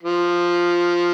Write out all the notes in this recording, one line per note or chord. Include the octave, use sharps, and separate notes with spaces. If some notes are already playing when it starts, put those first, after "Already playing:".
F3